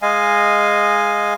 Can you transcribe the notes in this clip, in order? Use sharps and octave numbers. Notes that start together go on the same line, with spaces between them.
G#3 D#5 F5 G#5